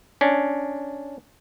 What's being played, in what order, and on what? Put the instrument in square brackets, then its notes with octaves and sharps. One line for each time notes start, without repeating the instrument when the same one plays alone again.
[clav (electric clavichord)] C#4 D4